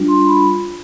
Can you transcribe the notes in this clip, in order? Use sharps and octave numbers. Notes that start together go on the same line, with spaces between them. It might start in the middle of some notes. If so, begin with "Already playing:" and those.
Already playing: G3 D4 F4
C6
B5